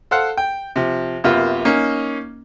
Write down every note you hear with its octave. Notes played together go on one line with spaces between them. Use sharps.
A4 C5 F5 F#5
G5
C3 F3
F#2 C3 A#3 B3 F4
A#3 C#4 D#4